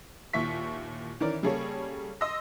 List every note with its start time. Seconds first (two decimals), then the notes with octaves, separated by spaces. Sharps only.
0.33 D#2 A#2 E4 E5 C#6 B6
1.20 D#3 E3 C#4 A#4 D5
1.43 C#3 G3 A#3 G#4 A4 C#5
2.21 D#5 C6 D#6 E6 A#6